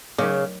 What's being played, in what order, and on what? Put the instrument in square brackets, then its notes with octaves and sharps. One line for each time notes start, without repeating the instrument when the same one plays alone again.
[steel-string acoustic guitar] C#3 [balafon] F#3 A3 D#4 A#4 C#5